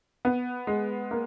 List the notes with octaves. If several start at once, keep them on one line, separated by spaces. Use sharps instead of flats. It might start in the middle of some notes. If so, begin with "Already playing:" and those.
B3
G#3
A#3